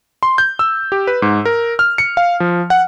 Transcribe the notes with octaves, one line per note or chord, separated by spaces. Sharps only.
C6
G6
E6
G4
B4
G#2
A#4
F6
C#7
F5
F3
F#5